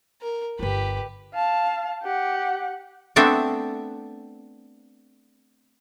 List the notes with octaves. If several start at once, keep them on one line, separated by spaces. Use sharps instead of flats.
A#4
G1 F4 G4 B4
F5 A5
G4 F#5
A3 B3 C4 D4 A4 E5